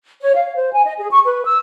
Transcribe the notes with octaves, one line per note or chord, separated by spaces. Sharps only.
C#5
F5
C5
G#5
D#5
G#4
C#6
B4
E6